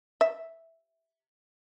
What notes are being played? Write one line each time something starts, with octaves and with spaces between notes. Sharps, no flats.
E5